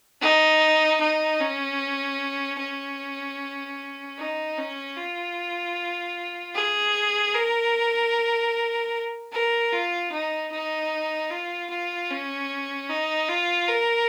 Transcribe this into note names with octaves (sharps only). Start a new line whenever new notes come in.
D#4
D#4
C#4
C#4
D#4
C#4
F4
G#4
A#4
A#4
F4
D#4
D#4
F4
F4
C#4
D#4
F4
A#4